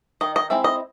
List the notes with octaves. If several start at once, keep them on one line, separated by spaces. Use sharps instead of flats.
D#3 D#5
D#5
G#3 C4 E4 E5
D#5